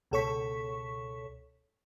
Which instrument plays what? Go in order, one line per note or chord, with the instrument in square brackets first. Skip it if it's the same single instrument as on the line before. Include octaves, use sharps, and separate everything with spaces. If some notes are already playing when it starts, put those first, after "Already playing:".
[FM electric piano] C#2 B2 A4 C#5 C#6 B6